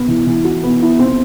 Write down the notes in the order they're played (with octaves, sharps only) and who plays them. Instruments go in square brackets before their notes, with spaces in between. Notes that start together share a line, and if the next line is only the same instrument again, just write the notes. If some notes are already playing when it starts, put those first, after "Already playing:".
Already playing: [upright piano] B3
E3
E3
F#4
B3
E4
C4